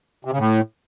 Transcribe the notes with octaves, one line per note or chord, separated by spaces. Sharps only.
C3
C#3
A2